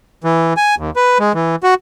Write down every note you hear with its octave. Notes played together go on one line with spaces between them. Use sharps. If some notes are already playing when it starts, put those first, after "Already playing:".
E3
G#5
D#2
B4
G#3
E3
F#4